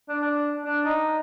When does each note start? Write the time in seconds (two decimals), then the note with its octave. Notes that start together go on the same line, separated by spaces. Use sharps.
0.08 D4
0.24 D4
0.65 D4
0.85 D#4